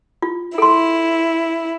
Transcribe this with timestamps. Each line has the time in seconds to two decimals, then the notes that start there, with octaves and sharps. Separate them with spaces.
0.22 F4
0.58 E4 A4 C6